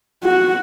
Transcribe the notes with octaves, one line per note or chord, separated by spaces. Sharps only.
F#4